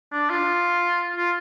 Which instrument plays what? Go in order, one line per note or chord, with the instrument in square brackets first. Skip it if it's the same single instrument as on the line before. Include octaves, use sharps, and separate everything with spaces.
[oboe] D4
F4
F4